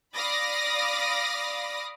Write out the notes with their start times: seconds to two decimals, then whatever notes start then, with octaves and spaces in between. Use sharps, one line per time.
0.15 D5 F5 B5 D6 D#6 A#6